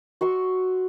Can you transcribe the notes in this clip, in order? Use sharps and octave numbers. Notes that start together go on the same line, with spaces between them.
F#4 C6 C#6 E6